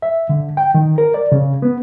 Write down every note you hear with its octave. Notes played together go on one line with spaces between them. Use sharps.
E5
D3
G5
D#3
A#4
D5
C#3
B3